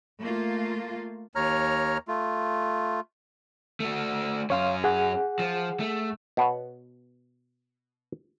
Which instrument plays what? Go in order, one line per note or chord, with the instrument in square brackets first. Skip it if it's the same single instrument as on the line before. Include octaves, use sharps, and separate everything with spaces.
[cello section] A3 A#3 F4
[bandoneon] D#2 C#5 A#5 F6
A3 F4
[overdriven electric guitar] A3 F#4
[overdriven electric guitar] F#2 C#4 [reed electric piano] C#5 F5 C6
[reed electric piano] G#4 F#5
[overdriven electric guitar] F3
A3
[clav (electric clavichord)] B2 B3 C#5 F#5